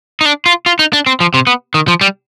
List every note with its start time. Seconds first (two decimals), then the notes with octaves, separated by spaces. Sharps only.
0.21 D#4
0.26 D4
0.46 F4
0.66 F4
0.79 D#4
0.93 D4
1.06 C4
1.20 F3
1.34 C3
1.47 B3
1.74 D#3
1.88 F3
2.01 G3